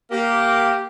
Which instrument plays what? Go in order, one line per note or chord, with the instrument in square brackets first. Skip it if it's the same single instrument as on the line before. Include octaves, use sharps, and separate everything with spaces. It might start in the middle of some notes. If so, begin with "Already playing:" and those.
[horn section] A#3 G4